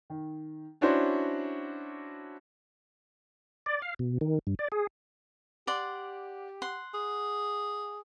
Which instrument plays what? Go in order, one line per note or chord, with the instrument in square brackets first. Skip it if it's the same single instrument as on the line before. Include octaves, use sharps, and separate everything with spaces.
[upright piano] D#3
C#4 D4 E4 F#4 C5
[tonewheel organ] D5
F5
B2
D#3
G2
D5
G#4
[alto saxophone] G4 [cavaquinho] D5 F#5 C6
[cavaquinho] F#5 C6
[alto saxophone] G#4